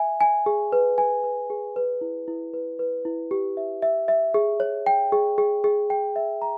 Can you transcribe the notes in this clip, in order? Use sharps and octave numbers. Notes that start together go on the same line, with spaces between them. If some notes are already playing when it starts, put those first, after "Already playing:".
Already playing: E5 G#5
G#5
G#4
B4
G#5
B4
G#4
B4
E4
E4
B4
B4
E4
G4
E5
E5
E5
G#4
C#5
G5
G#4
G#4
G#4
G5
E5
A#5